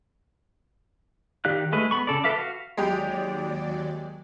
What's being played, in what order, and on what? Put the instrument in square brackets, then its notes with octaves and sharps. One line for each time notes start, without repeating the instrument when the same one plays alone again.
[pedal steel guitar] D#3 G4 D5 F5 F#6
G#3 A3 B4
B3 B5 C#6
C#3 A4 D5
A4 B4 E5 F5 D6
F#4 F5
[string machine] D#2 F#3 D5 [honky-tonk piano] G#3 G4